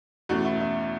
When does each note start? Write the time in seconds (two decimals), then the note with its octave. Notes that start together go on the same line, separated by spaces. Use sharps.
0.29 E2 B2 A3 C#4 F#4
0.45 E4
0.60 E4